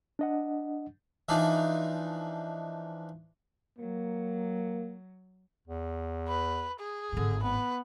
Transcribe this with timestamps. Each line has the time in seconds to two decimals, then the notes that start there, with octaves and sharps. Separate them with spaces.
0.19 D4 D#5 F#5
1.29 E3 F3 D4 D#4
3.78 F#3 A#3
5.68 E2
6.28 B4
6.80 G#4
7.12 G#1 A2 D3
7.43 B3 B4